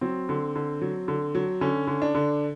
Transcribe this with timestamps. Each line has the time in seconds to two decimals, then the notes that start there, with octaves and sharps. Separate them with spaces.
0.01 F#3 C4
0.29 D3
0.56 D3
0.81 F#3
1.08 D3
1.35 F#3
1.61 D3 C#4
1.87 D3
2.02 D4
2.15 D3